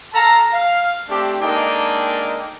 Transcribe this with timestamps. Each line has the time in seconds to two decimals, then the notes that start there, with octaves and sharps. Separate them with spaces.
0.13 A4 F5 A5 A#5
0.53 F5
1.09 A3 C4 D4 G4
1.40 G#3 A#3 D4 D#4 A4 G5